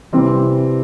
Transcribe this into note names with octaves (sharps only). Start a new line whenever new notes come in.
C3 E3 G3 C4